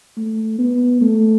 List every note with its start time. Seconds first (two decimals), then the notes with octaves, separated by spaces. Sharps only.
0.17 A3
0.58 B3
1.01 A3